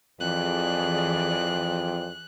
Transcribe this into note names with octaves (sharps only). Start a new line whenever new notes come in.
F2 E3 G#4 D5 F#6